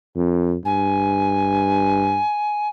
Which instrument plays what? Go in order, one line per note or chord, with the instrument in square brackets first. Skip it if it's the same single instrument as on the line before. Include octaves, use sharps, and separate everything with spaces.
[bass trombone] F2
[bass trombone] G2 [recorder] G#5